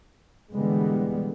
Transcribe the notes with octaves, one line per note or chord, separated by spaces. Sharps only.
B2 D3 E3 G3 G#3 B3